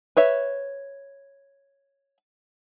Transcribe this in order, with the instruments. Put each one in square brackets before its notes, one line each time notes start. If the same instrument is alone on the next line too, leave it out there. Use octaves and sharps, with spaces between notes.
[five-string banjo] B4 C#5 E5